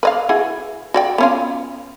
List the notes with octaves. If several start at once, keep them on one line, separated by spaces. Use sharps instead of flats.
B4 D#5 F5
E4 F#4 G#4
F#4 D5 G5
B3 C#4 F4